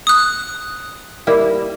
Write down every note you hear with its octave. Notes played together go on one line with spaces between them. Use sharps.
D#6 F#6
G3 A#3 E4